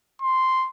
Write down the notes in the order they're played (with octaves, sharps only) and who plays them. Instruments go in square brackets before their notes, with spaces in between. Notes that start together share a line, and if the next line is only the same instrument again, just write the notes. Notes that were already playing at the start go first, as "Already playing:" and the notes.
[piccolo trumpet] C6